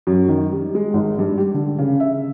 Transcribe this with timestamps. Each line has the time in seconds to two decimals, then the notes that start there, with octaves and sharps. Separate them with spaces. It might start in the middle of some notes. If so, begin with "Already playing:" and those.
0.07 F#2
0.28 D#3
0.51 G3
0.75 G#3
0.94 G#1
1.19 G2
1.38 G4
1.54 D3
1.78 C#3
2.00 E5